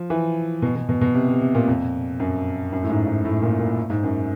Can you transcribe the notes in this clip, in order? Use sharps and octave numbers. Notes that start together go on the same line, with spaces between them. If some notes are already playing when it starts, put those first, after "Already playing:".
Already playing: F3
E3
B2
B2
B2
B2
C3
C3
C3
A#2
F2
F#2
F#2
A2
G#2
G#2
A2
A#2
A#2
G#2
F#2